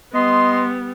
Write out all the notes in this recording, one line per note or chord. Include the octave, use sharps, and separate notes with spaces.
G3 B3 D#5 C6